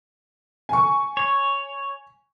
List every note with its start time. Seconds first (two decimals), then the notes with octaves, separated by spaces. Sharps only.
0.69 G#5 C#6
1.17 C#5